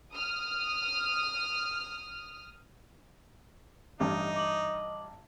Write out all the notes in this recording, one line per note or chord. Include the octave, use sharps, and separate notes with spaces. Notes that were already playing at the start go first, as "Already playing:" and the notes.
D#6 F6
A1 G2 D#4 D#5 D6
D6 F#7